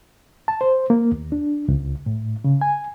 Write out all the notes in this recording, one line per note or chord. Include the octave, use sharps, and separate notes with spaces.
A5
C5
A#3
D#2
D4
C#2
A2
C#3
G#5